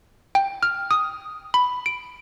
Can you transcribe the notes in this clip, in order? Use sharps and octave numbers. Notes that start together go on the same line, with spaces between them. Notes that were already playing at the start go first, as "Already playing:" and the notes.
G5
F6
D#6
B5
D7